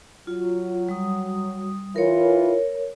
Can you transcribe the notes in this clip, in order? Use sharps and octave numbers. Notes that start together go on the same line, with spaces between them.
F#3 F4
G3 D#6
E3 F4 A#4 C#5